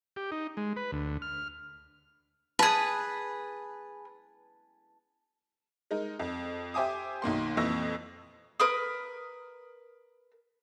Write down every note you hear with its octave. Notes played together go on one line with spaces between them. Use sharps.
G4
D#4
G#3
B4
D2
F6
G#4 B4 A5
G#3 D#4 A#4
F2
G4 C5 E5 G#5 D6 D#6
B1 D#3 A#3 C6
F2 A#2 E3 C#6 E6 A#6
A#4 B4 D#6